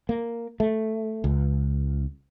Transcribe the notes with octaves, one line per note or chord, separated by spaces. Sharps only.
A#3
A3
C#2